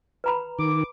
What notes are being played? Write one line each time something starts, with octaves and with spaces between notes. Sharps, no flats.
B4 A#5 B5
D#3 D6